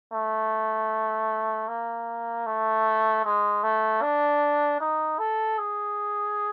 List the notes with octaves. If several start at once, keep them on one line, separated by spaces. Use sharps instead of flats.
A3
A#3
A3
G#3
A3
D4
D#4
A4
G#4